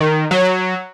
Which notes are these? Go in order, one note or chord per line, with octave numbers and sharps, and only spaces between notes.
D#3
F#3